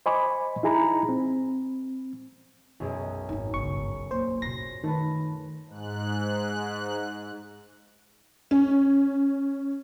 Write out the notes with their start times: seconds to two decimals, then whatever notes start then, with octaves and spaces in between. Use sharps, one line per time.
0.06 C5 D#5 G#5 B5 C#6 D6
0.63 D#4 E4 G#4 G#5 A#5 B5
1.09 C4
2.80 B1 F#2 G#4
3.29 G#1 D#4
3.54 G1 C#2 C#6
4.11 A#3 C5
4.42 B2 F4 C6 A#6
4.84 D#3 A3 A4 B4
5.67 G#2 F#6
8.51 C#4